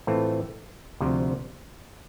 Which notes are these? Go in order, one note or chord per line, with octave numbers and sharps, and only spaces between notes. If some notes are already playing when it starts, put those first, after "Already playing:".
A2 E3 A3 C4 F4
D2 C3 F3